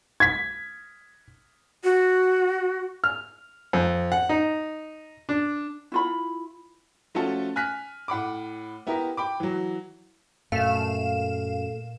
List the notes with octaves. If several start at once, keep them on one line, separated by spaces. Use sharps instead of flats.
G#6 B6
F#4
F6
F2
F#5
D#4
D4
E4 F4 B5
F3 A3 C#4 F4 F#4 A4
G#5 F6 F#6 B6
A2 F#5 B5 D6
B3 E4 G4 A#4
G5 B5 D6
E3 F#3
F#2 A#2 A3 F5 E7